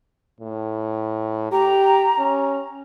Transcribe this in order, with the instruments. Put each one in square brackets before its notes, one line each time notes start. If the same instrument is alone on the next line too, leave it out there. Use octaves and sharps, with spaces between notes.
[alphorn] A2
[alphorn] G4 [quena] A#5
[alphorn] C#4